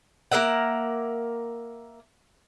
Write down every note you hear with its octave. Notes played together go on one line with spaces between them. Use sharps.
A#3 A#4 E5 F#5